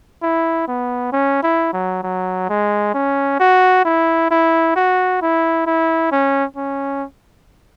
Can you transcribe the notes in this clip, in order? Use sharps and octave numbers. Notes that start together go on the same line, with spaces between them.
E4
B3
C#4
E4
F#3
F#3
G#3
C#4
F#4
E4
E4
F#4
E4
E4
C#4
C#4